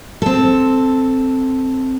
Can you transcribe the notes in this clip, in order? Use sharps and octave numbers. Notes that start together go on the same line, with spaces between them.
C4 A4